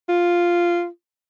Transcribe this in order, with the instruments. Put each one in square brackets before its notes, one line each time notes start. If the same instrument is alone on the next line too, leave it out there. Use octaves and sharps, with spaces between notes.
[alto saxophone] F4